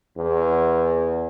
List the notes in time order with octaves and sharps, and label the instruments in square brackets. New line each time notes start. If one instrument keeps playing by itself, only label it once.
[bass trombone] E2